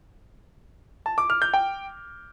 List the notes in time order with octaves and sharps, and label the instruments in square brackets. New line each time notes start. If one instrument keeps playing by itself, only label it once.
[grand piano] A5
D6
F6
G6
G5